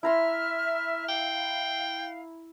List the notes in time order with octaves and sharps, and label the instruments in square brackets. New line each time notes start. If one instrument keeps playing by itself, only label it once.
[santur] E4 A#5 C6 [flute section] E5 F6
[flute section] F5 [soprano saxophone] G5